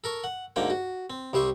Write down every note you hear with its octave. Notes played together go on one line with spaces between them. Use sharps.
A4 A#4 C#6
F#5
D2 G#2 D3 A#3 G5
F#4
C4
C2 G3 C5 E5 C#6